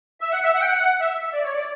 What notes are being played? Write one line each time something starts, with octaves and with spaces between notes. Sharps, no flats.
E5
F#5
E5
F#5
G5
F#5
F#5
E5
E5
D5
C#5
D5